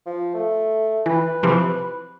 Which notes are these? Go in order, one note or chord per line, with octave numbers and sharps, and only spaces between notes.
F3
A3
E3 B4
C3 E3 F3